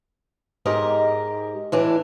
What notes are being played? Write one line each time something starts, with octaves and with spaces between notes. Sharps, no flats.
G#2 G4 A#4 D#5
A2 E3 D4